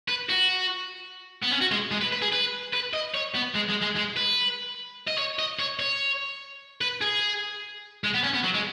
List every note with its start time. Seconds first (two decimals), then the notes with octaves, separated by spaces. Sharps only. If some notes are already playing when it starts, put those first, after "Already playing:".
0.08 B4
0.29 F#4
1.42 B3
1.51 C#4
1.61 F#4
1.71 G#3
1.92 G#3
2.01 B4
2.13 B4
2.22 G#4
2.32 B4
2.73 B4
2.94 D#5
3.14 C#5
3.34 B3
3.55 G#3
3.69 G#3
3.82 G#3
3.96 G#3
4.17 B4
5.08 D#5
5.18 C#5
5.39 D#5
5.59 C#5
5.80 C#5
6.81 B4
7.02 G#4
8.04 G#3
8.14 B3
8.24 C#4
8.34 B3
8.44 F#3
8.55 G#3